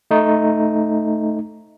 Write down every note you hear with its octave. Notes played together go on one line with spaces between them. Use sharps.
A3 D#4